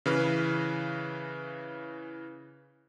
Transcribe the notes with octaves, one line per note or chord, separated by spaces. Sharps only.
C#3 E3 B4 F6